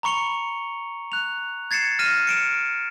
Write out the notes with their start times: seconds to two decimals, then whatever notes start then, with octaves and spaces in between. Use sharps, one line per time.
0.03 A#5 B5 C#6 C#7 F7 G7
1.12 F#6 F7
1.71 G#6 A6 C7 C#7 E7
1.99 F6 A#6 D#7 E7
2.27 C#7 D7 E7